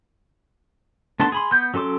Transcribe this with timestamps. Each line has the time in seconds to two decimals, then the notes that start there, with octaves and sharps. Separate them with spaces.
1.20 A3 B3 D4 A5 C6
1.32 G#4 B5 C6
1.52 B3 G6
1.74 F#3 C#4 A4 C6 D6